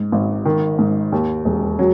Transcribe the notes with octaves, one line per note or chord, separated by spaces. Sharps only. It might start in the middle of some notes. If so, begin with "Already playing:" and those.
Already playing: G#2
G#1
D#3
G#2
D#2
E1
F#3